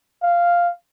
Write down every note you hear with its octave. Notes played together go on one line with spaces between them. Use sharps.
F5